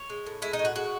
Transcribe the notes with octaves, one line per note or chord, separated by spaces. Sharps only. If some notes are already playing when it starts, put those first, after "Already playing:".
Already playing: C#5
G#3
A2
G#3 E4
D#4
A2
F#4
G#3 F#4